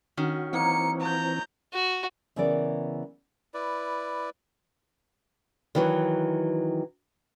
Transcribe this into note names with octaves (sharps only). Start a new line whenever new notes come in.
D#3 C#4 F#4
E3 F#3 A#3 C4 D#4 C#7
F3 C#5 A#5 G6
F#4
C#3 E3 B3 E4 A#4 D5
E4 B4 D5
D#3 E3 F#3